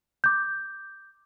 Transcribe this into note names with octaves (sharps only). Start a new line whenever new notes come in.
D6 G6